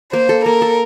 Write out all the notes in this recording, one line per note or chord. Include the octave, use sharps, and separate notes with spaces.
A#3 C5
A4
A#3 A#4
A4